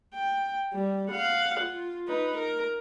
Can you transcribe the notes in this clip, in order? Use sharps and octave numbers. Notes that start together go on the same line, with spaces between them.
G5
G3
F5 F#5
F4
D#4 B4
A#4